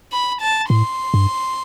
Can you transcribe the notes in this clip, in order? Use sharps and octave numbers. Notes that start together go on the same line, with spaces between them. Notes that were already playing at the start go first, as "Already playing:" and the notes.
B5
A5
A2 C6
G2